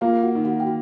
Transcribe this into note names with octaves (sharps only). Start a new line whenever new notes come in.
A#3 F4 F5
F#4 F#5
D#3
F#4 F#5
G5
F#4